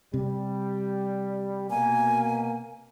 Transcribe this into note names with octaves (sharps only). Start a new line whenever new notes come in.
C3 G3
B2 A#3 G#5